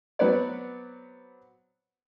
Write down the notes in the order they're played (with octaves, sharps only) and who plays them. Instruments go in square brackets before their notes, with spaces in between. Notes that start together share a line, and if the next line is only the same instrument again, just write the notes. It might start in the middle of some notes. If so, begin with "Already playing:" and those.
[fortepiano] F#3 B3 C4 B4 C#5 D5